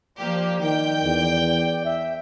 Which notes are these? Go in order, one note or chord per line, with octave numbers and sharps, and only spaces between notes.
F3 A#3 G4 D5
D#3 G5
E2
E5